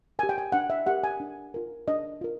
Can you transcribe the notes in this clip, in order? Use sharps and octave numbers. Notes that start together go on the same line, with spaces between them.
G4 A#4 G#5
G5
G#5
D4 F#5
E5
G4 A#4 F#5
G#5
D4
F4 A#4
D4 D#5
F4 A#4